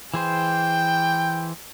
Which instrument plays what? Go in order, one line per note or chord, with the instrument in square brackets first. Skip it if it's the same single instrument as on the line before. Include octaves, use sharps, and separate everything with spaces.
[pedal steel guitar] E3 G#4 C5 [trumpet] G5